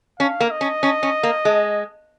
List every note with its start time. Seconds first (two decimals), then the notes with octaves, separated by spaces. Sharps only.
0.19 C#4 F5
0.40 A#3
0.51 D#5
0.61 C#4
0.83 C#4
1.03 C#4
1.23 A#3
1.45 G#3